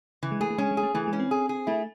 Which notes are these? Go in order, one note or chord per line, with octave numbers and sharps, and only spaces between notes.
C#3 E3
G#3
A3 G#4
A3
G#3 C#4
G#3
G#4
A3
E3 A3
G#3
C#4
C4
G#4
G#4
A3 E4